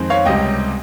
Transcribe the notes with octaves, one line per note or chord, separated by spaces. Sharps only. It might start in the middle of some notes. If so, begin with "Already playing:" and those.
Already playing: F2 D#3 G#3 C4
C#5 F5
C#2 C3 G3 D#5 G5